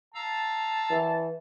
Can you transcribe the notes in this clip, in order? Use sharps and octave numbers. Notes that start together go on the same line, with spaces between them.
F5 A5 A#5 E6
E3